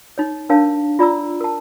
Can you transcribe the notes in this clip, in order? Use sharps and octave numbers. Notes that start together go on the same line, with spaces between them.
D#4 C#5
D4 A#4 C#5 F5 A5
F4 D5 A#5 E6
A#4 A5